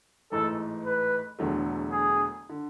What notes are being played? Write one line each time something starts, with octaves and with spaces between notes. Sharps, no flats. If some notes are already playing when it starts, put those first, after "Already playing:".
A1 G#2 E3 A3 A4
B4
E1 E2 D3 F#3 A3
G#4
D3